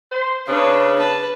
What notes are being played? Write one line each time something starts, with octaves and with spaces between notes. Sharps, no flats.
C5
C#3 D4 B4
B4 A5